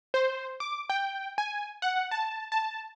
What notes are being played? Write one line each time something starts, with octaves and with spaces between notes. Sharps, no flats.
C5
D6
G5
G#5
F#5
A5
A5